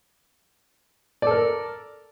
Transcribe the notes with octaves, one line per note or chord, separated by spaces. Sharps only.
A4 A#4 D5